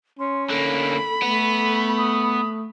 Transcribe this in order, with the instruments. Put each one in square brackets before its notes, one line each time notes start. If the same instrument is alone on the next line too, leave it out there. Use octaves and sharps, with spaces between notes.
[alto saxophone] C#4 [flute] C6
[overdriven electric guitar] D3 A#3 [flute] A4 [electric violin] B5
[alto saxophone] A3 [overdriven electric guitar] B3
[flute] D#6